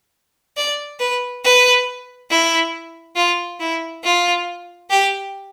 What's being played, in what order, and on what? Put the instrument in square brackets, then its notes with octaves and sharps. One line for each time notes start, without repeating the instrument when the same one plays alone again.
[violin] D5
B4
B4
E4
F4
E4
F4
G4